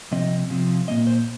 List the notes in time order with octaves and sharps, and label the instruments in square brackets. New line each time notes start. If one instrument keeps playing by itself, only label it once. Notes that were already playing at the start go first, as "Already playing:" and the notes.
[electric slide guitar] C3 F3 C4 D#5
C3 F3 C4
A#2 G3 A#3 D#5
C5